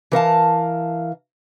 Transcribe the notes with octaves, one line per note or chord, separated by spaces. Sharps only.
E3 A#4 F5 A5